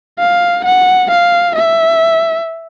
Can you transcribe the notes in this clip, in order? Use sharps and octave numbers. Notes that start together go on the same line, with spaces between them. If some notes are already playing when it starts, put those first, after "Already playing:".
F5
F#5
F5
E5